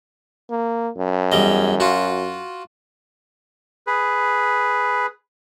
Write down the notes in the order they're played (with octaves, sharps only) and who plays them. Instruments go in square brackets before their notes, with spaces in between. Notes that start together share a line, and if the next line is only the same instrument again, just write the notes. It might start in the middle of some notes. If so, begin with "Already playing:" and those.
[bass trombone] A#3
F#2
[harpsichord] E2 G3 D#5
F4 F#4
[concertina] G#4 B4